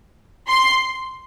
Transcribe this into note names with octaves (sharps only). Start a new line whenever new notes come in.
C6